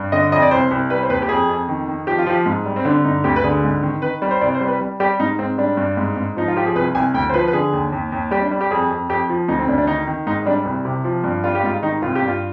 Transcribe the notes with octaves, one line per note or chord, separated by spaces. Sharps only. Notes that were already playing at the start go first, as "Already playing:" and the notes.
Already playing: G2
D3 D#5
F2 D#5
D5
C2 C5
C2
G3 B4
C5
D#2 B4
G4
F2 G#4
F2
D#3
D#3
F3 G4
F4
F3 G4
G#2
G3
C4
D3 D4
G2 D#4
D2 G4
B4
D3 G#4
G#2
D#3
D#3 B4
G3
C5
C2 D5
C5
G3
B4
G3
G3 G4
G#2 D#4
G#2 C4
G3 D4
G2
G#2
G#2
F3 D#4
F4
F3 G4
G#4
C2 B4
C2 G#5
D2 G5
C5
F3 B4
B4
D3 G#4
D#2
D#2
D#2
G3 G4
D4
G3
G4
F2 G#4
F2
F2 G4
F3
D2 D#4
C4
D2 D4
D4
D#3 D#4
D#3
G#2 D#4
G3 D4
C2
C3
F3
G2
G3 F4
G4
G#2 F4
D#3 D#4
C2 F4
G4
G2
F4